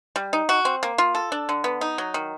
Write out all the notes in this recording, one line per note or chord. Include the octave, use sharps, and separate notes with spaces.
G3
D#4
F#4
C4
A#3
F4
A4
D4
D3
B3
D#4
F#3
D#3